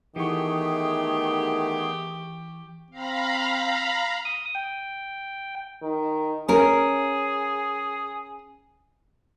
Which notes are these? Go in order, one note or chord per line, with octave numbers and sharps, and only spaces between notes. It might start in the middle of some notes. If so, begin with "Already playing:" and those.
D#3 E3 A3 B3 G4 G#4 C#6
C4 F5 A#5 B5
D#6
G5
D#3
C#4 G#4 A#4